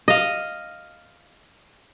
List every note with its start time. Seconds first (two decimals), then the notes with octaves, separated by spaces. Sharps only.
0.08 D#5 F5